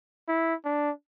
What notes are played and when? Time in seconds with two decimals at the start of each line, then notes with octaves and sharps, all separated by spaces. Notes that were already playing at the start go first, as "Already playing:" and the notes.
0.28 E4
0.65 D4